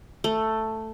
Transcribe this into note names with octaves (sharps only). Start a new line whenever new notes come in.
A3